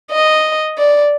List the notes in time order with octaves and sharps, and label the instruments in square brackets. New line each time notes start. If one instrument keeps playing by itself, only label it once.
[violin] D#5
D5